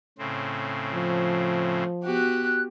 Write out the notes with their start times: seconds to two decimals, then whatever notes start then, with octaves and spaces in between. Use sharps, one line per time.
0.18 A2 C#3 C4
0.94 F3
2.04 B3 F#4 G4 F#6